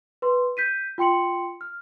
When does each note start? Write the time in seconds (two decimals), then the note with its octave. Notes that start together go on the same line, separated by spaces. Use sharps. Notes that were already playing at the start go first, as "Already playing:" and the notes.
0.22 B4 C6
0.57 G6 B6 D#7
0.98 F4 G5 C6 C#7 F#7
1.61 F6